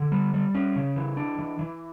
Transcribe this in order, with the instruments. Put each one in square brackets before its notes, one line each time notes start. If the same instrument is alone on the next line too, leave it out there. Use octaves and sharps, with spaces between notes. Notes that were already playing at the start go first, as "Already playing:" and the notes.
Already playing: [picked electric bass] D3
G3
G3
C#4
C#3
E3
D4
E3
E3